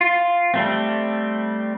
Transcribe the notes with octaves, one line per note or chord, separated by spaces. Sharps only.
F4
G3 A3 C4